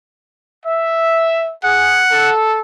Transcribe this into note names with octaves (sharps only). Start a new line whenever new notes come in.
E5
G#4 F#5
A4